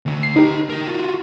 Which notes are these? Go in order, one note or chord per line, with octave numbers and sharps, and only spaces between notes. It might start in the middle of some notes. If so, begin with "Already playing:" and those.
D2 D3
C7
D#4 G4 B4 A#5
A#4 D#5
F4 F#4